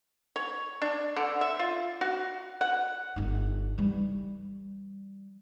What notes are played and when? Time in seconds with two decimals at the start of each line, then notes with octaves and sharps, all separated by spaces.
0.36 C#5
0.82 D4
1.16 D3
1.41 E5
1.59 F4
2.01 F#4
2.61 F#5
3.16 G1 D#4
3.78 E3 G3